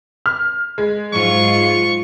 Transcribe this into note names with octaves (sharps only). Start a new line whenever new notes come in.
F6
G#3
G#2 F#3 F4 C#6